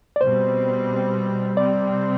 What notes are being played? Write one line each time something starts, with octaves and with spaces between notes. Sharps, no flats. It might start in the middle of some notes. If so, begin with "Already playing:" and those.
D5
B2 G3 C4 C5
C3 G3 C4 D5